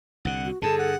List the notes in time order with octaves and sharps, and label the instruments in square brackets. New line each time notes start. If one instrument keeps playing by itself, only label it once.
[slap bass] C2 D3 [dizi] F#5
[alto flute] F#4
[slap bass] G2 D3 [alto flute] G#4 [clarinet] A4 [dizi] A5
[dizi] F#5